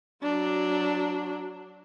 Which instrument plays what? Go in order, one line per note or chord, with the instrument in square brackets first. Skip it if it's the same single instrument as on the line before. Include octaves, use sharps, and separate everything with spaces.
[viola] F#3 D4